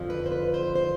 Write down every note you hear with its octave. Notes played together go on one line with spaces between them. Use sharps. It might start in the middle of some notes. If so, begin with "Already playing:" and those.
Already playing: F2 D3 F3
B4
C5
B4
C5
C5